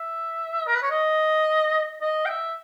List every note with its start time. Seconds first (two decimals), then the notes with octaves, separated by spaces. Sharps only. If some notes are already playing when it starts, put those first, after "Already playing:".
Already playing: E5
0.67 A#4
0.75 B4
0.83 C#5
0.91 D#5
2.01 D#5
2.26 G5
2.29 E5